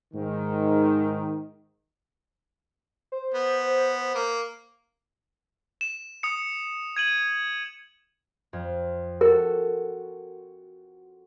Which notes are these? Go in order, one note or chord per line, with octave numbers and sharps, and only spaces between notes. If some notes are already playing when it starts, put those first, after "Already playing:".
G#2 D#3
C5
B3
A#3
E7
D#6 C#7
G#6 D#7 F#7
F2
F#4 A4 A#4